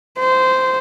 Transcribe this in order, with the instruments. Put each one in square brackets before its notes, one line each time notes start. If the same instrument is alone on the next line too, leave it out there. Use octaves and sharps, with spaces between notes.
[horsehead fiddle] C5